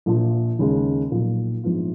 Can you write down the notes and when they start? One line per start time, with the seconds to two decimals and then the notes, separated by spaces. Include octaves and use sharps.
0.06 A#1 A#2 F3
0.59 D#2 C#3 G#3
1.11 B1 A#2 F3
1.64 A#1 G#2 F3 B3 F4